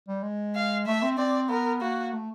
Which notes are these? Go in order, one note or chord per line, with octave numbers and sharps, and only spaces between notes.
G3
G#3
F5
A3 E5
C4
C4 D5
B3 A#4
A#3 F#4
A3